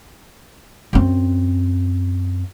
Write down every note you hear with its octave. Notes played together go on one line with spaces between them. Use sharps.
F#2 C4